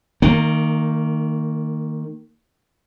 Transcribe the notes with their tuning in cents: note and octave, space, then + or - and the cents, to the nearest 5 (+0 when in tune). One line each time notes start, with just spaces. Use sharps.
D#3 +0 A#3 -30